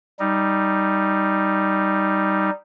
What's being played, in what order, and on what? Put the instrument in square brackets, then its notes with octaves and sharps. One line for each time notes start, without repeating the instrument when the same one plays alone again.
[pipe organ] G3 D#4